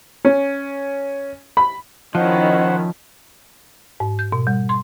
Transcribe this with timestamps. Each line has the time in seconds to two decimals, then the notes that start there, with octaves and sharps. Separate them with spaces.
0.25 C#4
1.57 B5
2.15 D#3 F3 C#4 E4 C5 D#5 F#5
4.00 G#2
4.19 G6
4.32 B2
4.47 G3
4.69 C6